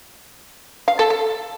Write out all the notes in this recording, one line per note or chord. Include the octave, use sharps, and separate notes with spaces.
F5
A4
A4